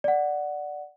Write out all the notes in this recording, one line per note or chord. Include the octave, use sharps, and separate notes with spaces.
D5 F#5